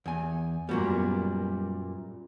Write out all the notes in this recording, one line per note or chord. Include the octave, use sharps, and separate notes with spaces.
E2 G#5
F#2 A#2 G3 B3 F#4